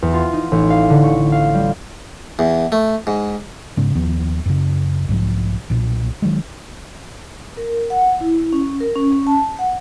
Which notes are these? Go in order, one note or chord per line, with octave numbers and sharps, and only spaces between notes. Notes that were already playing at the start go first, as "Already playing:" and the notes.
E2
F4
D#4
A1
F5
D3
C#6
F5
G3
E2
A3
G#2
G#2 C#3
D#2 F3 B3
F#2 C#3
B1 G#2 E3 F3
B1 A#2
D#3 F#3 G#3
A#4
F#5
E4
C#4
A#4
C#4
C#4
A5
F#5